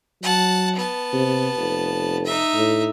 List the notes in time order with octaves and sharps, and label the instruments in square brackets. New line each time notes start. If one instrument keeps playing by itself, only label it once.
[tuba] F#3 [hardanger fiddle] F#5 A5
[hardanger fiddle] B3 A5
[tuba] C3
F1
[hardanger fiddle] D#4 E5
[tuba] A2